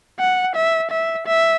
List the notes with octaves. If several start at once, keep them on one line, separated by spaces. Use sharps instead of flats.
F#5
E5
E5
E5